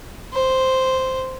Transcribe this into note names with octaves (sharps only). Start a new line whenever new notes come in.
C5